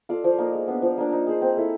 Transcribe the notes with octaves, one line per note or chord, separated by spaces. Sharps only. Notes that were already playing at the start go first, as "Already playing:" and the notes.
F4 A4 D5
F3
A#3 D#4
G#3
B3 D4
F3
A#3 D4
D#4
G#4 C5
C4
E4 A4